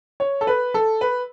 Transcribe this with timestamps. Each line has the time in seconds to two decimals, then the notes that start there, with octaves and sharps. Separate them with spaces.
0.20 C#5
0.41 A4
0.47 B4
0.74 A4
1.01 B4